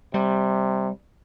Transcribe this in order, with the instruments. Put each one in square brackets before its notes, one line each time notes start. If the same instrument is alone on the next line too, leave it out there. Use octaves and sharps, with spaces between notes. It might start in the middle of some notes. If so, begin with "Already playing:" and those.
[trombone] C3 [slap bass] G3